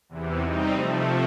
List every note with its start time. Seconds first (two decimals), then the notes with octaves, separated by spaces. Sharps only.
0.09 E2 C3 E3
0.41 G3 C4 D#4
0.72 C3 F3 A3